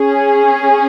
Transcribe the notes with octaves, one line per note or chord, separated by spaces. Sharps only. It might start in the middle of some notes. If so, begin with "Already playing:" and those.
Already playing: C#4 G#4